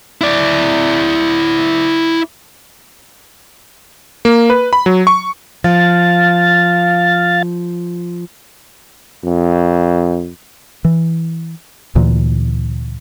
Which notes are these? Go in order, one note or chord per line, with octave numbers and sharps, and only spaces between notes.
E4 D5
A#3
B4
B5
F#3
C#6
F3 F5 A6
F2
E3
D2 A#2 E3